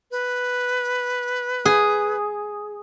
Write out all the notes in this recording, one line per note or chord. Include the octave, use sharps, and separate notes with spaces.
B4
G#4